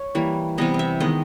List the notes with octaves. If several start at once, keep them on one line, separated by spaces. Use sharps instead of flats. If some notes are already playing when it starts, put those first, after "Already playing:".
Already playing: C#5
E3 G3 A#3
C3 E3 G3 B3 D#5
D#5
E5
D#3 G#3 B3 D#5